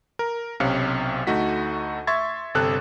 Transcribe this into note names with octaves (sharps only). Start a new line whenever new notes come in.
A#4
B1 C3 C#4 F5 C#7
D2 A3 D#4 F#4 B6
E5 C6 C#6 G#6 A6
G1 C3 A4 F#6